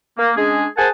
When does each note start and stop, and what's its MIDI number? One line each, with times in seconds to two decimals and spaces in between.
0.17 0.30 58
0.36 0.64 56
0.36 0.64 61
0.36 0.64 62
0.36 0.64 68
0.77 0.88 68
0.77 0.88 70
0.77 0.88 72
0.77 0.88 78
0.77 0.88 80
0.77 0.88 81